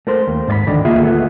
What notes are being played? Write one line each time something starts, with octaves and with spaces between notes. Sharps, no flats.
A3 A#4 C5
D#2
G#2 D5 B5
D2 D3 D#3 D5 D#5
C#2 A#3 F4 G#4 D#5 E5
D2 A3 B3